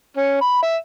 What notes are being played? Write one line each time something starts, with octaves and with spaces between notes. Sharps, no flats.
C#4
B5
E5